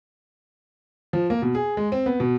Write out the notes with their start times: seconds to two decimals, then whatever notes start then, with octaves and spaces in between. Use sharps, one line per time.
1.13 F3
1.30 A#3
1.42 B2
1.55 G#4
1.77 G#3
1.92 C4
2.06 B3
2.20 B2